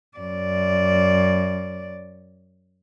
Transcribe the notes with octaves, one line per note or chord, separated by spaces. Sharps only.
F#2 D5